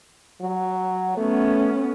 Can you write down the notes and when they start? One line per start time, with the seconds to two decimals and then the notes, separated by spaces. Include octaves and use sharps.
0.41 F#3
1.17 A3 B3 C#4